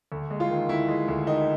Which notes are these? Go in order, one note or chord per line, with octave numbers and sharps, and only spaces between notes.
D2
G#3
F4
D#3
D2 E4
G#3
D2
D#3 D#4